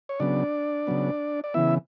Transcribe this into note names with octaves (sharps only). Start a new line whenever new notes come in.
C#5
C#3 F#3 B3 D4 D5
C#3 F#3 B3
D5
C#3 E3 B3 E4 E5